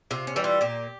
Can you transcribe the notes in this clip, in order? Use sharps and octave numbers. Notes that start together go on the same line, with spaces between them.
C3 F4
C#4
E3 G3
F4
A#2 G4